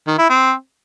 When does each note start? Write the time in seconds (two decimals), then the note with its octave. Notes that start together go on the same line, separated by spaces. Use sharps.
0.07 D#3
0.18 E4
0.29 C4